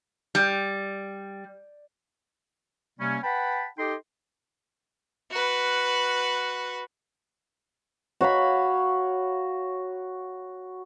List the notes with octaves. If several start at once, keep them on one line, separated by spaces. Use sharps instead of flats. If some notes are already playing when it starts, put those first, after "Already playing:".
G3
C3 G3 A#3 C#4
B4 F#5 G5 A5 B5
D#4 G4 A4 D#5 G5 C6
F#4 B4
F#4 C#5 F5 B5